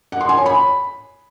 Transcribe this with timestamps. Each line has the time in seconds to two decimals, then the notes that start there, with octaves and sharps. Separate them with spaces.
0.12 F#5
0.21 C6
0.29 G#5
0.37 C#5
0.46 B5